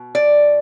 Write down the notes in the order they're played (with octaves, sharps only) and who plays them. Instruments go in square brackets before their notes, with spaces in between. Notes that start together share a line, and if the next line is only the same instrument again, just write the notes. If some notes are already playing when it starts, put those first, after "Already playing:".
Already playing: [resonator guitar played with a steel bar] B2
D5